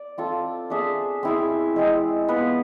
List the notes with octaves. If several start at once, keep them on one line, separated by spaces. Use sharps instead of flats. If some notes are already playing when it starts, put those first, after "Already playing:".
Already playing: D5
C4 F4 A4
D4 G#4 C5 E5
C4 E4 G#4
G#3 C4 G#4
B3 F4 B4